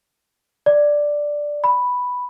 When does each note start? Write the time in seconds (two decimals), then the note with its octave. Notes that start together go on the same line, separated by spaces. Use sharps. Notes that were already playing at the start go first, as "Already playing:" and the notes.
0.66 D5
1.64 B5